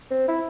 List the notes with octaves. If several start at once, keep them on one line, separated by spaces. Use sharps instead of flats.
C4
E4